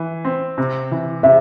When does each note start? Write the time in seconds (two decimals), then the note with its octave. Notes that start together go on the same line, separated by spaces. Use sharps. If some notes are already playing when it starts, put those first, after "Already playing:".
Already playing: E3
0.25 C4
0.58 C3
0.91 E3
1.23 C3 E5